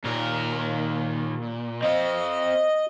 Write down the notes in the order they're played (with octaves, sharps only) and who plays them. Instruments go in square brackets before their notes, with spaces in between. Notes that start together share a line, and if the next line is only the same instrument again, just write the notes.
[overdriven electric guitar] D#2 A#4 [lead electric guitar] A#2
[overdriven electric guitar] C4 F5 [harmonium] D#5